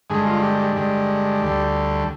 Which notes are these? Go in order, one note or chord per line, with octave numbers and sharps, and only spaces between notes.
G2 D3 G#3 G#4
F4
G4
G4
G2 D3 G#3
D2 D3 G3